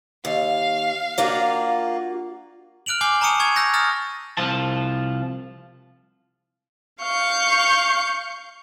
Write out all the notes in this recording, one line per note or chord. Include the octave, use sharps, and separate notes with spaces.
D#2 F5
A#3 D4 F4 F#4
F6 F#6 D7 F7 F#7
G#5 D6 G6 C7 G7
A5 A#5 C#6 D#6 C#7 D#7
C#6 G#6 F7
E6 F#6 G6 A#6 C#7 F7
A#5 D#6 F6 A6
C2 F3 A5
F5 C#6 G6